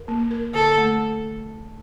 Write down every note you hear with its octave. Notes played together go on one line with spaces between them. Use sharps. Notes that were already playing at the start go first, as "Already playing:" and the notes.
Already playing: A#4
A#3
A#4
D3 A4
A3